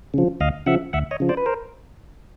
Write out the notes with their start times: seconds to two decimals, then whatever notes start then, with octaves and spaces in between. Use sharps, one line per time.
0.14 C#3 F3
0.40 D2 D#5 F5
0.66 C#3 F3 E5 F#5
0.93 D2 E5 F#5
1.11 C#5 D#5
1.20 C#3 F3
1.29 C5 D5
1.37 B4
1.46 A#4 C5